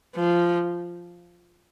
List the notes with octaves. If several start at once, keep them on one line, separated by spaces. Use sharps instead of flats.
F3